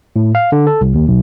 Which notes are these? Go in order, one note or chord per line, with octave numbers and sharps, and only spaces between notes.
A2
F5
D3
A4
C2
D#2
B1